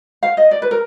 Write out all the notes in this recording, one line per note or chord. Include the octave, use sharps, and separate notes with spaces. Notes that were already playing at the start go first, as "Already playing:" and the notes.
F5
D#5
D5
B4
A#4